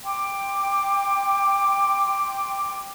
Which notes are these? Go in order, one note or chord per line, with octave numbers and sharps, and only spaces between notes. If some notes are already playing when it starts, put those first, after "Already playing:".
G5 C6 D6